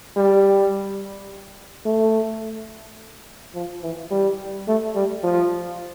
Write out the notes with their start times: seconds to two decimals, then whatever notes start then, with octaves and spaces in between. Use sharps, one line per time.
0.17 G3
1.86 A3
3.55 F3
3.83 E3
4.11 G3
4.68 A3
4.95 G3
5.24 F3